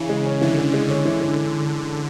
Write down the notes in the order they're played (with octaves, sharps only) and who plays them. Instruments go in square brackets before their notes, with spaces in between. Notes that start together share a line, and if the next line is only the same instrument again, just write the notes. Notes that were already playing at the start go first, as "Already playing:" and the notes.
Already playing: [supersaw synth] C#3 [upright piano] E3
[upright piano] G#3
C#4
[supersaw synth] D3 [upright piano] E3
[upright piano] E3
G#3
[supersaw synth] D3 [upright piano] C#4
[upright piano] E3
E3